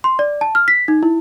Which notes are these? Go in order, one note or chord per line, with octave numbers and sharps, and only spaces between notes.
C6
D5
A5
F6
B6
D#4
E4